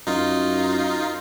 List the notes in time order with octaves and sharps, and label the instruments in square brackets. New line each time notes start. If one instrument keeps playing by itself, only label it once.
[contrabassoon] F#2 [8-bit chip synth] D#4 F4